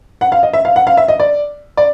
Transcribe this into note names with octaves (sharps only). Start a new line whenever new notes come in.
F#5
F5
D#5
E5
F5
F#5
F5
E5
D#5
D5
D5